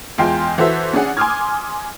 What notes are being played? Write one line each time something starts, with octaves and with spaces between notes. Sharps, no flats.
E2 G#3 F4 G5 G#5 C6
E3 F#4 A4 C5 E5
C#4 D4 G#4 F#5
G#5 C6 D6 D#6 F6 G#6